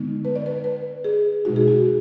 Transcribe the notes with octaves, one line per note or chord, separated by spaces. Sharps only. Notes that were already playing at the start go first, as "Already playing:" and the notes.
Already playing: D3 G#3 B3 D#4
B4
D5
B4
B4
G#4
B2 G#3 D#4 F#4
G#4
F#4